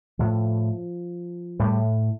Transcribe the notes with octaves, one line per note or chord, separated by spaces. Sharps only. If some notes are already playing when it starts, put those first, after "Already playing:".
A2 F3
A2 G3